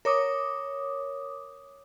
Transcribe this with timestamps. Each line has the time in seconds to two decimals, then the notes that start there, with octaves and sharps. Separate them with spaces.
0.05 A#4 C#5 D6 D#6